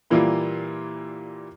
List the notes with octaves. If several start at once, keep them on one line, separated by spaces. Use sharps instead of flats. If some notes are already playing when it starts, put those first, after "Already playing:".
A#2 E3 G3 A#3 E4 F4